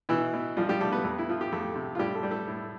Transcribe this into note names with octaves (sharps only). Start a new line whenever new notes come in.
B2 E3 E4
B2
F3 G3 F4
G3 G4
G3 A3 A4
B3 B4
F2
E4
F3 F4
G4
F2 A3 A4
C3
F4
A2 G3 G4
A3 A4
G3
A3 A4
A2